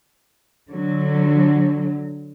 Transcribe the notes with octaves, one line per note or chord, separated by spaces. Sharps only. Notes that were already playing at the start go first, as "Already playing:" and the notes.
D3 F#3